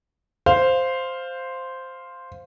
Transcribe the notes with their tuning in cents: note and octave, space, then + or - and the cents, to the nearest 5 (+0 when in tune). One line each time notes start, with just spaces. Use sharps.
C5 +0 F5 +0